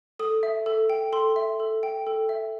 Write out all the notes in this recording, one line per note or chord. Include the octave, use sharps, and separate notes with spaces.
A4 D#6
E5
A4
G5
A4 C6
E5
A4
G5
A4
E5